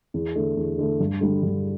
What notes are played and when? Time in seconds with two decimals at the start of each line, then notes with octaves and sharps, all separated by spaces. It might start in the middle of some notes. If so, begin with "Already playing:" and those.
0.14 E2
0.36 D3 A3
0.57 E2
0.78 D3 A3
1.00 G2
1.21 D3 G3
1.43 G2